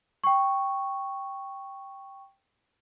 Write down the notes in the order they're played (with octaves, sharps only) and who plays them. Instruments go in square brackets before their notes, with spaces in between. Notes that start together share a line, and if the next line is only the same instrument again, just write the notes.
[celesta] G5 C#6